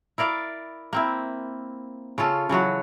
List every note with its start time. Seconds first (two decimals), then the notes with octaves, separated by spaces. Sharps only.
0.18 E4 A#4 D5 F5
0.93 A#3 C4 E4
2.18 C#3 C#4 F4 A4
2.49 C#3 E3 F#3 F#4